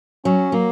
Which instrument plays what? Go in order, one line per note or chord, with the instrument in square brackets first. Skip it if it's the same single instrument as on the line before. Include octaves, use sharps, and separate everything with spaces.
[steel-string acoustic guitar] F#3 [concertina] C#4
[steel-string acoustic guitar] F#3 [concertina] A#3